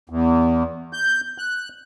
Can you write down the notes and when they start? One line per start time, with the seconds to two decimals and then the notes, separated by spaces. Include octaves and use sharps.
0.10 E2
0.93 G6
1.38 F#6